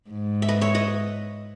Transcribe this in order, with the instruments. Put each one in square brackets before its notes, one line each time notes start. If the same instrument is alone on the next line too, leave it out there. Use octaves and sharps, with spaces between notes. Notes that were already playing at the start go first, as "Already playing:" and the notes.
[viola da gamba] G#2
[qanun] E5
B4 D#5
C#5 E5
B4 D#5